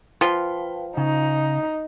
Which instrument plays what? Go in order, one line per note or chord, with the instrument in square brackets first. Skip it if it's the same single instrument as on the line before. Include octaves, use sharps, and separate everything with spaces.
[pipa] F3 [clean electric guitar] B4 F5 G5
[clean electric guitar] C#3 [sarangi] D#4